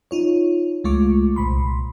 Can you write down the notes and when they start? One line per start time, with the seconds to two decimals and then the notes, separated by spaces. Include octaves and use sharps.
0.11 D#4 F4 C#5
0.84 C#2 G#3 A3 F4 C#6 D6
1.36 C2 A#2 B5 C6